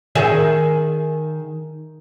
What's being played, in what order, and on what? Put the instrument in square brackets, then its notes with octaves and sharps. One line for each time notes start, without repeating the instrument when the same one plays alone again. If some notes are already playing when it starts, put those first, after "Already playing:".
[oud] D#3 G#4 E5